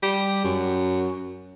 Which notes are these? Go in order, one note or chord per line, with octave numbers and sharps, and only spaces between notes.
G3
F#2